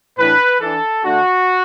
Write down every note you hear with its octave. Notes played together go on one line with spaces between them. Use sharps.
A2 E3 D4 B4
E3 D4 A4
D3 A3 D4 F#4